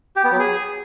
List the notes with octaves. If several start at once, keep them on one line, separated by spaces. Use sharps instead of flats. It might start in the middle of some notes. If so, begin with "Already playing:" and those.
G4
B3
F#3
G#4